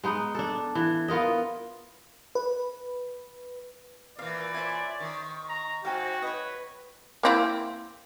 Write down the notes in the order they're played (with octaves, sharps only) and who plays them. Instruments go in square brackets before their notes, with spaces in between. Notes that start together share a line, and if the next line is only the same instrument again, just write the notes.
[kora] G#3 B3 D#4
D4 A4
E3
B3 F4 A#4 D#5
[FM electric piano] B4
[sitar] A#2 E3 [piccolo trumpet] D5 [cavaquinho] F5
[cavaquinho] C5 C#5 G#5 [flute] E5
[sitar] D#3 [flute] C#6
[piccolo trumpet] A#5
[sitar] G#2 [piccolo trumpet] F#4 [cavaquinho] F5 G5 G#5
[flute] B4 [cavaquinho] C#5 D#5
[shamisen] A#3 C4 E4